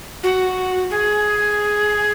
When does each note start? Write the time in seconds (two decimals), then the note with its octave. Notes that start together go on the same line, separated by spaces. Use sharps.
0.23 F#4
0.91 G#4